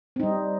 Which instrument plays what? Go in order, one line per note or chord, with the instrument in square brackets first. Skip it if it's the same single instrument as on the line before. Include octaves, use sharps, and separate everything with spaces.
[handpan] C4
D#4
G3